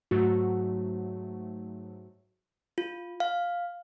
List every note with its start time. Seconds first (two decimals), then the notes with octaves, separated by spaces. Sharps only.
0.11 G#2 F#3 A3 F#4
2.78 F4
3.20 F5